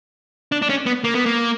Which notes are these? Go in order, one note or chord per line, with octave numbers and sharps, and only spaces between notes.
D4
D4
C#4
B3
A#3
B3
A#3